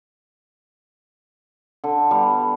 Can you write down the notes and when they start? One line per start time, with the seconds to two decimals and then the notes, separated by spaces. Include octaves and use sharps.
1.84 D3
2.11 G3 B3